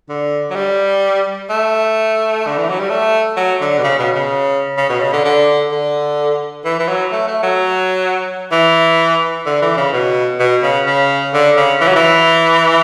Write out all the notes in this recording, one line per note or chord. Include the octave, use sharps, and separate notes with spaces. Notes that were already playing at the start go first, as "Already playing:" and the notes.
D3
F#3
G3
A3
D3
E3
F#3
G3
A3
F#3
D3
B2
C#3
B2
C#3
C#3
B2
C#3
D3
D3
D3
E3
E3
F#3
A3
A3
F#3
E3
D3
E3
C#3
B2
B2
C#3
C#3
D3
C#3
E3
F#3
E3